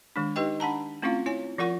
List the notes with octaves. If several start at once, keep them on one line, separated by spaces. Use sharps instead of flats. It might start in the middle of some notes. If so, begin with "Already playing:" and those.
D#3 G#3 D4
D#4 G4 B4 D#5 G5
D4 F#5 A5 A#5
A3 C4 C#4 E4 F4 F5
E4 C#5 G#5
F3 F4 A#4 F#5 C#6